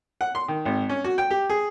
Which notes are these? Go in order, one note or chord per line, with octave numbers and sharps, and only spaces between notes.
F#5
C6
D#3
G#1
C#4
F#4
G5
G4
G#4